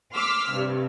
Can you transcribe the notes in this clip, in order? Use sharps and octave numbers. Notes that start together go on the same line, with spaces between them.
C6 D6 E6 F6 B6
G2 C3